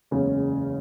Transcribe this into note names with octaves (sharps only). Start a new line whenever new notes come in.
F#1 E2 C#3 G#3 C#4